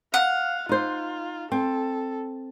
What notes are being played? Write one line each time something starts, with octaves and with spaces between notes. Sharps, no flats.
F5 F#5
D#4 F4 C5
C4 A4